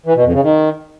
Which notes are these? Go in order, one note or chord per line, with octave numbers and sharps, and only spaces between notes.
E3
B2
F2
C#3
D#3